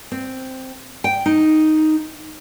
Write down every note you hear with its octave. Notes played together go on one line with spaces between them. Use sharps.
C4
G5
D#4